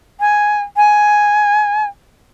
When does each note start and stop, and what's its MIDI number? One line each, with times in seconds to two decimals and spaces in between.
0.20 0.62 80
0.77 1.86 80